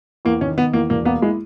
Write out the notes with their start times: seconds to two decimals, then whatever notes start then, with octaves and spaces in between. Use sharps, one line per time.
0.25 E2 A#3
0.41 D#3 C#4
0.57 D#3 B3
0.73 E2 A#3
0.90 E1 A#3
1.05 A#3 B3
1.22 G#3 E4